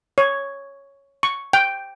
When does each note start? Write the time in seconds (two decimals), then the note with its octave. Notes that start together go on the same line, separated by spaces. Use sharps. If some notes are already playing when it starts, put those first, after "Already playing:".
0.18 C#5
1.23 C#6
1.53 G5